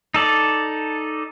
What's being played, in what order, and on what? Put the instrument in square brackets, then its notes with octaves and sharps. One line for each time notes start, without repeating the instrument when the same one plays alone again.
[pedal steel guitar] D#4 A4 D5